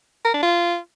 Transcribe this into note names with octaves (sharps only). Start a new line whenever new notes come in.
A#4
D4
F4